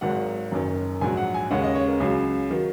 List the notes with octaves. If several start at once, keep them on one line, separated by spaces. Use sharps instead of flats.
G#1 G#2 D#3 F#3 F#5
F#1 F#2 D#3
A#1 G#2 F#3 G#5
F#5
G#5
D#2 C#3 G#3 C#4 F#5
D#5
C#5
A#4
C#2 C#3 F#3 G#4
D#3 F#3